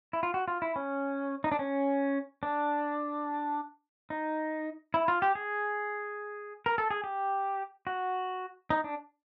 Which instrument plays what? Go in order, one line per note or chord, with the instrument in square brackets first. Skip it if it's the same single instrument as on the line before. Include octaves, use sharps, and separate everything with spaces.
[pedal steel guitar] E4
F4
F#4
F4
E4
C#4
D#4
D4
C#4
D4
D#4
E4
F4
G4
G#4
A#4
A4
G#4
G4
F#4
D#4
D4